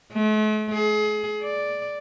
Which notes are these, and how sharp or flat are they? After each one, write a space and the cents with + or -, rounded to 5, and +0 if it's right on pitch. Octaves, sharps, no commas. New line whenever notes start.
A3 -45
G#4 +30
D5 +0